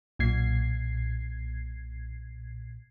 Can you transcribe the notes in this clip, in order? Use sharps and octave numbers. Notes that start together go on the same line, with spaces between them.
B1 A#2 G#6 C7